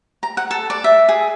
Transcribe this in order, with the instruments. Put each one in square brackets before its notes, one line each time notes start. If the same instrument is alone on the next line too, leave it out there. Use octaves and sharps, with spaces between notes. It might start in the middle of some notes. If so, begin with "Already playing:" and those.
[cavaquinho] A#5
F#5
A4
D5
E5
G#4